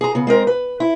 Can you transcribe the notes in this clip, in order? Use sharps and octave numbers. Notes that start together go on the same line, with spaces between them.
G#4 A#5
C#3 B3
G#3 C4 A#4
B4
E4